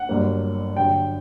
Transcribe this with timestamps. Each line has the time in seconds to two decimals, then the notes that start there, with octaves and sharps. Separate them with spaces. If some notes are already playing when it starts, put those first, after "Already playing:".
Already playing: F#5
0.09 G1 G2 F#3 A#3
0.76 G2 D3 F#3 G5